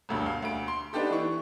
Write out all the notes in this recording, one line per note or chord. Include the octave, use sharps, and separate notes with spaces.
E1 D2 G2
F5
D2 D7
C6
B3 D4 D#4 G4 A4
E3 C#6